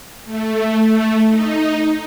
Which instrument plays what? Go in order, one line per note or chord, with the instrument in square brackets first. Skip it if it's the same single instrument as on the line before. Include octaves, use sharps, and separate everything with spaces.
[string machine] A3
D#4